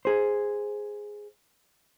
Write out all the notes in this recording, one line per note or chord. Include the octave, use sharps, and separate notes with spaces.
G#4 C5